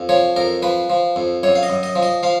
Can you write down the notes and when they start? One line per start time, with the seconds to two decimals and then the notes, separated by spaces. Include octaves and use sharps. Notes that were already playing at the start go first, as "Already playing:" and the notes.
Already playing: F2
0.09 F3 C#5
0.36 F2 A#4
0.62 F3 B4
0.90 F3
1.16 F2
1.43 F#2 C#5
1.55 F5
1.63 D#5
1.70 F#2
1.83 D#5
1.96 F3
2.03 D#5
2.23 F3 F5